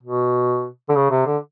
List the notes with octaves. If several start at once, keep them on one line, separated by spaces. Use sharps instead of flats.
B2
D3
C#3
C3
D3